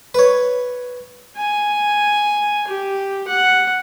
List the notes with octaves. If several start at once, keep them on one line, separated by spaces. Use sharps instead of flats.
B4 C#5
G#5
G4
F#5